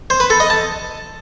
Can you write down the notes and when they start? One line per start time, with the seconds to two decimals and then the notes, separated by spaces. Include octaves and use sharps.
0.10 C5
0.20 B4
0.30 A4
0.40 D#5
0.50 A5